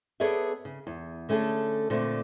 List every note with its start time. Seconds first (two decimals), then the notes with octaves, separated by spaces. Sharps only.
0.20 B3 G#4 A4 C#5 D5 E5
0.65 C#3
0.87 E2
1.29 D3 A3 C#4 G#4 A4
1.90 A#2 D3 A3 C4